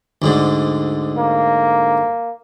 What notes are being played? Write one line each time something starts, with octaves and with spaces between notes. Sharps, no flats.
D2 G#2 D3
A#3